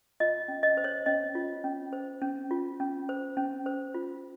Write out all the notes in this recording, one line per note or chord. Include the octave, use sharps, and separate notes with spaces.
F4 D#5
C#4
D#5
C5
C#5
C#4 D#5
F4
C#4
C5
C#4
F4
C#4
C5
C#4
C5
F4